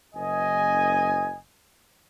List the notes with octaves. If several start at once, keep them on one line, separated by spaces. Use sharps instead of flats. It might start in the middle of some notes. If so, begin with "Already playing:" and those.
F#1 D#5 G#5